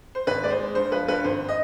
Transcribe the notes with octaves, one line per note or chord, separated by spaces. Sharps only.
C5
G#1 B4
G#3 D5
C5
G#3
G2 C5
F3 B4
G2 B4
G#1 C5
D#5